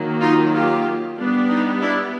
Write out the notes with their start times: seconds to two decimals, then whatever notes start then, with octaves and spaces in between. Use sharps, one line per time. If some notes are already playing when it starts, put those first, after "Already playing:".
Already playing: D#3 F#3 A#3
0.21 D#4 F4
0.53 F4 G4
1.17 G3 B3 D4
1.49 D#4
1.80 D4 E4